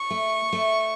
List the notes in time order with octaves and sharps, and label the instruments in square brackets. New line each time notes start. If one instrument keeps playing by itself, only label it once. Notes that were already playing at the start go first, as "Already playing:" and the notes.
Already playing: [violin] C#6
[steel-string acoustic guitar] A3
A3